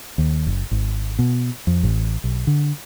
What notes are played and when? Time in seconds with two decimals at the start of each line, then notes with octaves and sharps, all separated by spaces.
0.18 D#2
0.47 F#1
0.71 G#1
1.19 B2
1.67 F2
1.83 A1
2.24 B1
2.47 D3